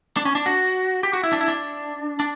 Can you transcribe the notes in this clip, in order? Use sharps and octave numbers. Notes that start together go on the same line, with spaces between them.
D4
C#4
D4
F#4
G4
F#4
E4
D4
E4
D4
D4